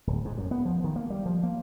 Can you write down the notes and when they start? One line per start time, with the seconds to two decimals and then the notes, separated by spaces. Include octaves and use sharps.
0.07 D1
0.25 G#2
0.38 F#2
0.51 B3
0.65 F3
0.84 D#3
0.96 A#3
1.10 G3
1.26 F3
1.43 A#3